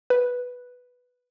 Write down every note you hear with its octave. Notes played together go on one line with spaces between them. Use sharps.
B4